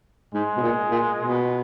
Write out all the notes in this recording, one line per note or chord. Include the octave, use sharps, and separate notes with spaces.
G#2 G#3
B2
A#2
A#2
B2